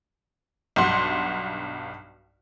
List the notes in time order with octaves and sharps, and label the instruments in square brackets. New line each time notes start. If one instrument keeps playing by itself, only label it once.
[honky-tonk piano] B1 G2 F#5 C6